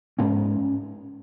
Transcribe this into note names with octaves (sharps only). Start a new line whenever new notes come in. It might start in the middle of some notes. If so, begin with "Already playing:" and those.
G#2 C#4